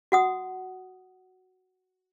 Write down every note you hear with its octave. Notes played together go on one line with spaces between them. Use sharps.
F#4 F#5 D#6